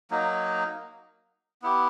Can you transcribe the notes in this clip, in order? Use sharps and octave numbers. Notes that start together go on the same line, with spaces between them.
F#3 A#3 D#4
B3 E4 G4